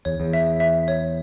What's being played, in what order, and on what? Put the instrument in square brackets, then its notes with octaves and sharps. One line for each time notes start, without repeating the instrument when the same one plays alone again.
[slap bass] E2 [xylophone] C#5
[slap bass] E2
[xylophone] E5
E5
C#5